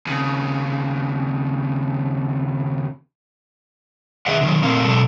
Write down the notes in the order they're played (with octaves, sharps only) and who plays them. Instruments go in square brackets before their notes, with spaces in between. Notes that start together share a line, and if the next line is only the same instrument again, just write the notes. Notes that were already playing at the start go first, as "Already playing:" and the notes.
[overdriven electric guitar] D#2 C#3
[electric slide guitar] D#3 G#4 B4 D#5 E5 F#5
D3 D#3 F#3
A#2 A3 C4 A#4 F5
B2 F#3 G#3 A4